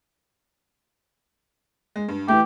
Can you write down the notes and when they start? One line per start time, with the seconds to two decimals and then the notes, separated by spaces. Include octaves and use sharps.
1.96 G#3
2.08 G2
2.28 E3 A3 G4